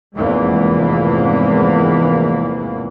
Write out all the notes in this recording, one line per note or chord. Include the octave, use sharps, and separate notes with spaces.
F1 E2 G#2 E3 G#3 A#3